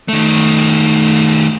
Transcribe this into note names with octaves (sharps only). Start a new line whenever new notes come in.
D#3 A3